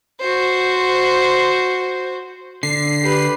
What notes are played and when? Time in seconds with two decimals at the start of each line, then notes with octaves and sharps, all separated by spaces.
0.20 F#4 C5
2.63 D3 C7
3.02 G4 B4